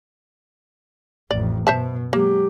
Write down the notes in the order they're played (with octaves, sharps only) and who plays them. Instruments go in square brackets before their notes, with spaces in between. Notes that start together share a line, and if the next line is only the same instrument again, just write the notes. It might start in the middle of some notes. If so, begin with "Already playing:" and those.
[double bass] A1 F2 [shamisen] D5
[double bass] F#2 B2 [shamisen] C5 E5 A5
[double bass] F#3 G#3 [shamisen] A#3 [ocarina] G4